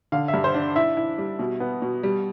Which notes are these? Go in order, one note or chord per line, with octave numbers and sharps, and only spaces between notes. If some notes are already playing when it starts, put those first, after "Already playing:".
D3 F5
E5
G2
C5
D4
E4 E5
E4
G3
B2
B3
B2
G3